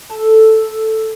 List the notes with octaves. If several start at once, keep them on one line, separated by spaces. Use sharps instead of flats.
A4